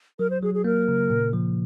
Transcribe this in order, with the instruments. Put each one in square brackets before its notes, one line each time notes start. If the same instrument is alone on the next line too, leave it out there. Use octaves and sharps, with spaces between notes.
[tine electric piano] F#3 [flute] A#4
[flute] C5
[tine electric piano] F#3 [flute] G#4
[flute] G#4
[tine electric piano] A#3 [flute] A#4
[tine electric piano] C#3
A#2
F3